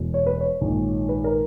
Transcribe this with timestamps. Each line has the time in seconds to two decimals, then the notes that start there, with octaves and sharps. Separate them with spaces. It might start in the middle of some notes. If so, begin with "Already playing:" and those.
Already playing: E1 E2 B2
0.14 C#5
0.26 B4
0.41 C#5
0.61 A#1 G#2 D#3
1.09 B4
1.24 A#4